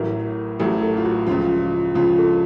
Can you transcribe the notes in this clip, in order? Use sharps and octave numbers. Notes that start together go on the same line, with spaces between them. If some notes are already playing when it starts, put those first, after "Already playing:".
Already playing: A1 A2 F#3 A#4
A1 A2 F#3 A4
A4
F4
F#4
C#2 C#3 F3 F4
C#2 C#3 F3 F4
A4